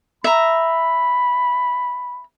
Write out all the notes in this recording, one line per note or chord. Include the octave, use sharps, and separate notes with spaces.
E5 A#5 B5